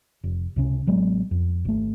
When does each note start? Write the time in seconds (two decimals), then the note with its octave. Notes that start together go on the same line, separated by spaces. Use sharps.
0.24 F1
0.56 C#2 C3 C#4
0.87 A1 F#3 G#3 B3
1.31 F2
1.65 G#1 A3